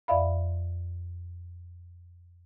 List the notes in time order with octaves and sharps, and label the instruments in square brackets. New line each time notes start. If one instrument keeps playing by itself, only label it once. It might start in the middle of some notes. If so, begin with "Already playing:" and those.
[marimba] F2 D5 E5 F5 B5